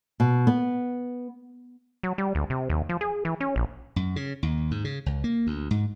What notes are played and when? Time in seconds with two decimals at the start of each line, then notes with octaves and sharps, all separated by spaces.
0.20 B2
0.47 B3
2.03 F#3
2.18 G3
2.35 D2
2.50 C3
2.70 D#2
2.89 F3
3.01 G#4
3.25 E3
3.40 C#4
3.56 A#1
3.96 F#2
4.16 C#3
4.43 D#2
4.71 G#2
4.84 C#3
5.06 C#2
5.24 A#3
5.47 D2
5.71 G#2